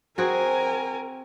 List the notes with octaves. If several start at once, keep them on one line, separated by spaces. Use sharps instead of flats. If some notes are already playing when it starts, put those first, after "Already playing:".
C4 F#4 G#4 A#4 G#5